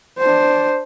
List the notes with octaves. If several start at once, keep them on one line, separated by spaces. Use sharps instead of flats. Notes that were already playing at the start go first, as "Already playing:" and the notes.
D4 C5